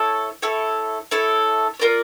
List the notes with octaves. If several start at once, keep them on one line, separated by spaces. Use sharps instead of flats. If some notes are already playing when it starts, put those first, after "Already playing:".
Already playing: E4 A4 C#5
E4 A4 C#5
E4 A4 C#5
F4 A#4 D5